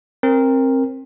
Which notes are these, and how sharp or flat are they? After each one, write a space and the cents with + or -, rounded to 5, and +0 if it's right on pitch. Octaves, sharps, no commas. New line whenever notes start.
C4 +25 A#4 +0